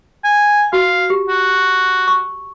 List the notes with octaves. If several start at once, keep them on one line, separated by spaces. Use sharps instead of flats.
G#5
F#4 F5
G4
F#4
C#6